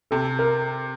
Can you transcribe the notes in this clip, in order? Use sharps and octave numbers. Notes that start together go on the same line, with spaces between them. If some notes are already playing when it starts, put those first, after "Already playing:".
C3 A4
A#4